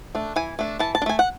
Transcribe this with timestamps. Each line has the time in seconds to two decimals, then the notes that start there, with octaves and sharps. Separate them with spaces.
0.15 A3 D4
0.36 E3 G#5
0.59 A3 D4
0.79 E3 A5
0.95 A5
1.02 D4
1.06 A3 G#5
1.19 F#5